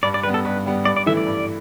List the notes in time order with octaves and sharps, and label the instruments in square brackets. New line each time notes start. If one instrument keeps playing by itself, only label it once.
[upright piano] G2 [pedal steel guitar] D5
[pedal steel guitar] D5
[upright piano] G3 B3 [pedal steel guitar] B4
[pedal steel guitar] A4
[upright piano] G2 [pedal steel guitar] B4
[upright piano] G3 B3
[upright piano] G2 [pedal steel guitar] D5
[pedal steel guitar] D5
[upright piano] E3 A3 E4 [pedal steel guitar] E5
[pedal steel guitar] D5
[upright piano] G2